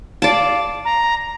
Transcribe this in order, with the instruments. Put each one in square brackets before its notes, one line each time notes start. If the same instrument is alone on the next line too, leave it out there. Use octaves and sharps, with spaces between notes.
[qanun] D5 A5 [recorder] F5
[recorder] A#5